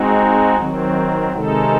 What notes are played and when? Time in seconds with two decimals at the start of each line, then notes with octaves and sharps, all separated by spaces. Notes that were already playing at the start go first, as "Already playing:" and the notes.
Already playing: G#3 C4 D#4 F#4
0.57 D#3 F#3 C4
1.33 C3 D#3 G#3 D#4 A4